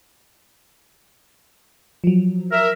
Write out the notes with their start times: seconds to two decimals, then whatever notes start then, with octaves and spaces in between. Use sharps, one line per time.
2.04 F3 F#3
2.51 A#4 E5